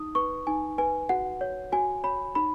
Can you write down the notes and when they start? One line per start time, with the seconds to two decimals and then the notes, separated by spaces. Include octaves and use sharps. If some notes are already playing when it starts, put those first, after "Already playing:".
Already playing: D#4 D#6
0.15 B4 C#6
0.47 D#4 G#5
0.78 B4 G#5
1.09 F#4 F#5
1.41 C#5
1.72 F#4 G#5
2.04 C#5 B5
2.35 D#4 B5